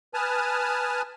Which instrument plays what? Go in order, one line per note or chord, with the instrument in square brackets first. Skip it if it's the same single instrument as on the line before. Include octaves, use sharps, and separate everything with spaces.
[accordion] B4 G#5 A5 D#6 F6